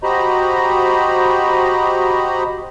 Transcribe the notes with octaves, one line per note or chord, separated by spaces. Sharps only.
F#4 G4 C5 D#5 A#5 B5